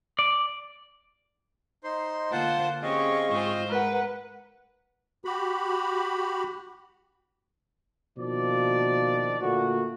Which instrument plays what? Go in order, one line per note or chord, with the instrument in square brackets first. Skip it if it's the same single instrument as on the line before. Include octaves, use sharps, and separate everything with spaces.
[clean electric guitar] D5
[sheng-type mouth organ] D#4 C5 C6
[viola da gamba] D3 A#3 C5 [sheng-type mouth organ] F4 F#5 A5
[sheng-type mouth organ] C4 D#5 F5 [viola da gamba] C#4 G4 [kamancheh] G#4 C#6
[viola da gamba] G#2 F4 C5
[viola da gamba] G#3 [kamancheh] A#4 F#5 [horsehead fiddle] B4
[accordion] F#4 G4 B5
[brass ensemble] B2 D#3 F3 A#3 D4 D5
A#2 D3 A3 A#3 F#4